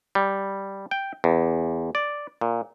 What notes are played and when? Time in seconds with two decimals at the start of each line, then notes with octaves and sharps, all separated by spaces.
0.15 G3
0.91 G5
1.24 E2
1.95 D5
2.41 A#2